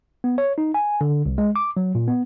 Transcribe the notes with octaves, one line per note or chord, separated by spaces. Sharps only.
B3
C#5
D#4
G#5
D3
C2
G#3
D6
F#3
A#2
B3